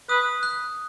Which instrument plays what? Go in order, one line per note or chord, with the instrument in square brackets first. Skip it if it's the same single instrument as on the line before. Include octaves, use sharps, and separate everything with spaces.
[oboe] B4 [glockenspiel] D#6
[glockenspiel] F#6